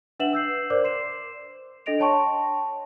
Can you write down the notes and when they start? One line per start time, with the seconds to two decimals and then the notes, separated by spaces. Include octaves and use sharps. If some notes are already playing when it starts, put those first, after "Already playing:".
0.20 D4 B4 E5 F#5 E7 F#7
0.33 E6 G6 C7
0.70 A#4 C5 D5 D6
0.84 C6 C7 E7
1.86 D4 A4 D#5 A#6 D7 F7
2.00 C#5 G5 A5 C6 C#6